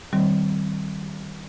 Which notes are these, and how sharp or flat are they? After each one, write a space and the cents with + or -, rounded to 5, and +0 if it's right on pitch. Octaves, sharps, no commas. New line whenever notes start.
D#3 +0 G3 -20 C4 +0